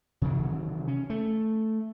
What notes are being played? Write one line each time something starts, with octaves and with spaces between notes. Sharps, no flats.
C3 D#3 E3 F#3
C#4
A3